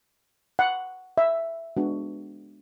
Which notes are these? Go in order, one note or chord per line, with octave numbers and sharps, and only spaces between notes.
F#5
E5
G#3 B3 D4 F#4